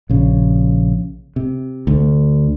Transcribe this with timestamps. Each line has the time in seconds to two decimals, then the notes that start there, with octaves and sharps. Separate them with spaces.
0.10 A#1 C#3
1.36 C3
1.87 D2